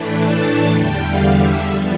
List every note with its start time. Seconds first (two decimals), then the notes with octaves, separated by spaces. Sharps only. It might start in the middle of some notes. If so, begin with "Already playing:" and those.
Already playing: A2 E3 A3 D4
0.23 A5
0.71 E2 D3 G3 G5
1.03 F5
1.34 E5
1.66 G2 F3 B3